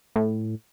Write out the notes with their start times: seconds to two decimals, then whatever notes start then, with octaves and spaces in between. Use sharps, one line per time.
0.16 A2